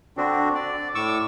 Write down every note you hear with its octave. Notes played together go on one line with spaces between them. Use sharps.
D3 C4 D4 F#4
D5
A2 C#6 D6 E6